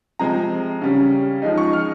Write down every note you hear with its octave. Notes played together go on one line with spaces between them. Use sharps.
C3 F3 G#3 C4 A#5
C#3 G3 C#4
F3 G#3 D#4
C#6
F6